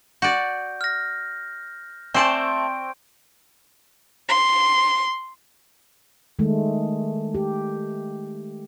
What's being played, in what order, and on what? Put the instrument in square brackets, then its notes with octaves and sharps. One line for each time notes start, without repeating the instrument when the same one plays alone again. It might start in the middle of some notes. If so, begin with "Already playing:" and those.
[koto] F#4 D5 [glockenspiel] G6
[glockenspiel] F6 A#6
[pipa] A3 G#5 [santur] C4 [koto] C5 D5 A5 [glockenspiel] C#6 D7
[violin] C6
[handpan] D#3 G#3 A3
G4